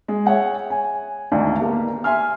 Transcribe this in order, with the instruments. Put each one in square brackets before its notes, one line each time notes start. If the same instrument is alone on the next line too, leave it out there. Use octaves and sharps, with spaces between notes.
[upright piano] G#3
G#4 C#5 E5 F#5 G5
G#5
G#1 D2 D3 D#4 D5
A#3 B3 G4
E5 G#5 C6 F6